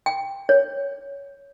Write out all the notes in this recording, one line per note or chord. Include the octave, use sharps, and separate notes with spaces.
G5
C#5